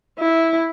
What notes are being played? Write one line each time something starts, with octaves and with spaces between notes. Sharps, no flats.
E4